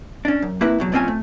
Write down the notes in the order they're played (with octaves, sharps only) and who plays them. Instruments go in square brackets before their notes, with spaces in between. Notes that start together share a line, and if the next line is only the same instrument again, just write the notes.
[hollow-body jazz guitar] C#4 D4
F#2
A#3 C4 E4 B4 E5
E2 B2 F#3
B1 A#2 C4 C#4 F4 G#5
A3